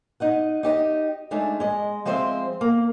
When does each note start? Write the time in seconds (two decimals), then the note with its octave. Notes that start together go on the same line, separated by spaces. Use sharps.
0.20 D#4 D#5 F#5
0.63 D#4 G4 D#5
1.31 G#3 A3 D4 D#4
1.60 G#3 D#5
2.05 F3 G#3 C4 C5 D5 E5
2.61 A#3